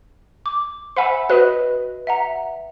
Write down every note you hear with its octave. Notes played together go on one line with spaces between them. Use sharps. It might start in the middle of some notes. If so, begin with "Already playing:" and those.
D6
C5 E5 F#5 G#5 B5
F#4 B4 D#5 F#6
E5 F#5 A#5